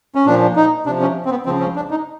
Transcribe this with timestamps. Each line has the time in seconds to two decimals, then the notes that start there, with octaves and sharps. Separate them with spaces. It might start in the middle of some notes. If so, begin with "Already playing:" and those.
0.15 C#4
0.26 A#2 F3 D4
0.56 D#4
0.86 C3 F3 D4
1.01 C#4
1.25 C4
1.30 B3
1.46 C#3 F3 C4
1.60 C#4
1.76 D4
1.91 D#4